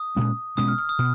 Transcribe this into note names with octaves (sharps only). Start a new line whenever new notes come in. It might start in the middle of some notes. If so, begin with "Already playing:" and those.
Already playing: D#6
A#2 G#3 C#4
B2 G#3 C#4 D#6
F6
F6
D#6
B2 F6